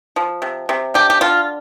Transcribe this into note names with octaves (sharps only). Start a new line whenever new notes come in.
F3
C3
C3
D3 G4
G4
D3 F4